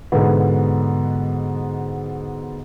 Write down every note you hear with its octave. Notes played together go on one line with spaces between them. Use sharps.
G#2 B2 D3 B3